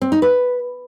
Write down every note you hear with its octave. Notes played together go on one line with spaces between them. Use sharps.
C4
D#4
B4